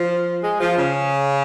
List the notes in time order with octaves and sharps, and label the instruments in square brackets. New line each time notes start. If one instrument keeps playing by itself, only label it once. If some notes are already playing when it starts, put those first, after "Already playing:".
Already playing: [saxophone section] F3
G#3
F3
C#3